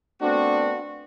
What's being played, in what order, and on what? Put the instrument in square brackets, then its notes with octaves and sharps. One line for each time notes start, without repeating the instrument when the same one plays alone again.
[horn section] A3 B3 C4 D4 F#4